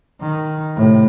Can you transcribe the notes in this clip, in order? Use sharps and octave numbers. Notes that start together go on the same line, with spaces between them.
D#3
A2 C3